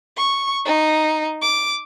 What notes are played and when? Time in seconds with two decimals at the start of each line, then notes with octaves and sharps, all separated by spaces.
0.17 C#6
0.65 D#4
1.42 D6